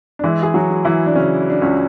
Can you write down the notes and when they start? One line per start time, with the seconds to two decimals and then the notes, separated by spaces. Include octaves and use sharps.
0.19 D4
0.24 E3 G#3 E4
0.43 G#4
0.54 F#3 F#4
0.70 G#3
0.85 E3 E4
1.06 D4
1.15 C#3 C#4
1.50 D4
1.62 C#2 C#4